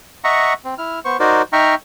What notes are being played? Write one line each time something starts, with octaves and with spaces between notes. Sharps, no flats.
D#5 E5 F#5 A#5 C#6
C4
E4 F6
B3 C5 C#6
D#4 F#4 A#4 C5 D5
D#4 E5 G5 A#5 C#6 F6